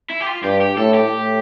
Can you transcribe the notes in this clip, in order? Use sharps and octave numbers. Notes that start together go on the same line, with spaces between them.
E4
G4
F4
G2 G4
G4
A2 A4
G4
A2